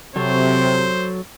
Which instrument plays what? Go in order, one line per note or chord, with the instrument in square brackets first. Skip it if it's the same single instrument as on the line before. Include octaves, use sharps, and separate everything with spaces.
[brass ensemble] C3 [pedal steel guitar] F#3 A4 C#5 [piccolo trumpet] C5